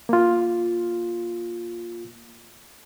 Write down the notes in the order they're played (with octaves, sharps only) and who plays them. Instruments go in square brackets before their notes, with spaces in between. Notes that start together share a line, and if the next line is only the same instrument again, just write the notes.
[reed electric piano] A#3 F4